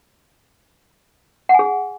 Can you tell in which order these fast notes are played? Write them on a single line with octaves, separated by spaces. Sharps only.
F#5 G#5 G#4